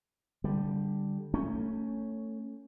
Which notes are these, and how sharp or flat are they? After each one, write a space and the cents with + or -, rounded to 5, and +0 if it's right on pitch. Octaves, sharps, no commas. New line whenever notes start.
D3 +0 G3 +0
A3 +25 C#4 +0